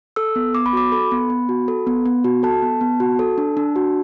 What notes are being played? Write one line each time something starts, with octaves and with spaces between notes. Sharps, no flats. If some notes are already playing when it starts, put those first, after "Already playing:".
A4 E6
B3
B3 D6
B5
F#4 D6
A4 B5
B3
B3
F#4
A4
B3
B3
F#4
A4 A5
B3
B3
F#4
A4
D4
D4
F#4